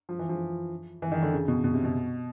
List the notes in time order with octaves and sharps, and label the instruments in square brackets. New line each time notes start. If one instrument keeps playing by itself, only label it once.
[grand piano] F3
E3
F3
E3
D#3
D3
C#3
B2
B2
C3
B2